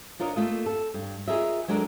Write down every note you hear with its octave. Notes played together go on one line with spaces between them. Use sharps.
D4 F4 A#4 C#5 D#5
A3 A#3 F4 A4 D#5
A4
G2
F4 G#4 A#4 C#5 D#5 E5
F#3 G#3 D4 A4 A#4